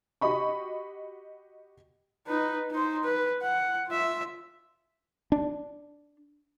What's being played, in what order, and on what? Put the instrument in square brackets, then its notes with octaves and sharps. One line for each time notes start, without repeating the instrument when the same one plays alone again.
[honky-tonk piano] F#4 G4 D#5 B5 C#6
[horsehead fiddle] D#4 B4
D#4 C5
B4
F#5
F4 E5
[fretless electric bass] D4